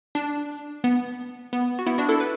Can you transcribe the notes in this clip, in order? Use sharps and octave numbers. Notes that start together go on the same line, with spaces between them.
D4
B3
B3
F#4
B3 E4
D4 F#4
E4 A4
B4